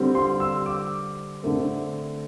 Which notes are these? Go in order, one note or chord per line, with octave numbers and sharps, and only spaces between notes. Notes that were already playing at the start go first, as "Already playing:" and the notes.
Already playing: D3 G3 C4
C6
E6
D6
D3 A3 C4